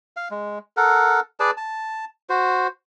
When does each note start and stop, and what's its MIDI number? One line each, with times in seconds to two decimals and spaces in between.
0.17 0.28 77
0.31 0.59 56
0.77 1.20 69
0.77 1.20 70
0.77 1.20 78
1.40 1.51 68
1.40 1.51 71
1.40 1.51 74
1.40 1.51 81
1.57 2.05 81
2.29 2.67 66
2.29 2.67 72